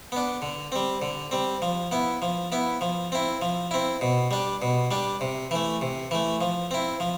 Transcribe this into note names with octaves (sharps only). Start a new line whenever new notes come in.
B3 D4
D3
G3 C4
D3
G3 C4
F3
B3 E4
F3
B3 E4
F3
C4 E4
F3
C4 E4
B2
G3 D4
B2
G3 D4
C3
E3 A3
C3
E3 A3
F3
C4 E4
F3